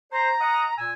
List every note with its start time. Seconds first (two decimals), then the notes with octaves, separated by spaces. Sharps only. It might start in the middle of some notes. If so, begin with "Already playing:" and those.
0.12 C5 A#5
0.41 D#5 F#5 D#6
0.78 A#2 G#5 E6